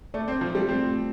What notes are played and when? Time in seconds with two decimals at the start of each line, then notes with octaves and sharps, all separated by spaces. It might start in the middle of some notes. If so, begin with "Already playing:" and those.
0.14 A3 D5
0.28 C4
0.32 D5
0.41 F3
0.50 G3 F4
0.68 A3 C4
0.87 A3